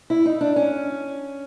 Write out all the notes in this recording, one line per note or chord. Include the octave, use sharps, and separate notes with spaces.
E4
D#4
D4
C#4